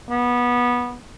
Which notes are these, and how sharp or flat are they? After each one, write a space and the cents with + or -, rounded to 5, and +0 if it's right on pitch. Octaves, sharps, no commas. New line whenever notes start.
B3 -20